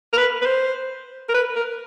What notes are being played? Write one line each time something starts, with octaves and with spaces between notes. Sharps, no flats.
A#4
B4
B4
C5
A#4
B4
A#4